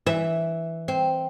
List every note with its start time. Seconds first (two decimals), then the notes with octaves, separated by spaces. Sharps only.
0.06 E3 E5
0.88 C4